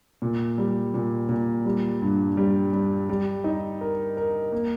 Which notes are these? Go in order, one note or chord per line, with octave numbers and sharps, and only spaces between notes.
A#2
G3
A#2
A#2
G3
G2
G3
G3
G3
D#4
A#4
A#4
A#3